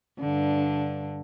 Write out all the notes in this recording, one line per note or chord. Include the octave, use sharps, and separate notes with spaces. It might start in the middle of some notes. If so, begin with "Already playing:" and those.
G2 D3